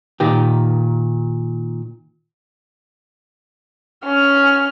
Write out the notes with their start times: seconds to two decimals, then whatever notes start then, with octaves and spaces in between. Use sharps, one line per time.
0.20 A#2 D#3 G4
4.05 C#4 F6